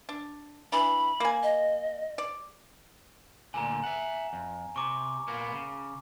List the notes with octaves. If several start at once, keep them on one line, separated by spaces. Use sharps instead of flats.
D4
E3 D4 B5
A#3 G#5
D#5
D5
D2 A#2 D3 G#5 A#5
E5 F#5
F2
C3 C#6 D6
A#2 A#3 B3
C#3